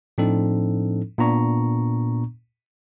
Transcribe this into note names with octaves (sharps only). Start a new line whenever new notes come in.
A2 F3 C4 D4 D#4 A4
A#2 B3 D4 A#5 C#6